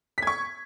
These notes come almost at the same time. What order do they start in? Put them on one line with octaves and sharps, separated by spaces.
B6 G#6 C#6